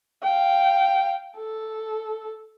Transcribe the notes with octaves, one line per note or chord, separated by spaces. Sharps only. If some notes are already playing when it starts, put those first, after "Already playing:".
F5 G5
A4